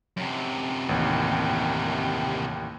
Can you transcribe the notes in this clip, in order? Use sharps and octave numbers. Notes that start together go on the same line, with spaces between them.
F#2 C3
A1 D#2